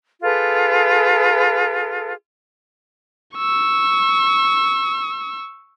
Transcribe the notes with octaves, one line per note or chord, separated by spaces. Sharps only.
F4 G#4 A4 B4
C#6 E6